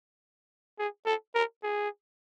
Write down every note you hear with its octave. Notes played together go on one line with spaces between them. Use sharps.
G#4
A4
A#4
G#4